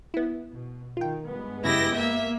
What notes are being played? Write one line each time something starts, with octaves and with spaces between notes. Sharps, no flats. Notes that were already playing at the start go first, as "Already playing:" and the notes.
B3 E4
B2
D#3 F4 G5
G2 G#3 B3
F#2 C#3 E4 G4 D#5 G#6 A#6
A#3 E5